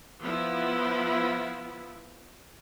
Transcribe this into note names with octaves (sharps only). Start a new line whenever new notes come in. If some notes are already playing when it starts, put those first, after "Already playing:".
F3 B3 E4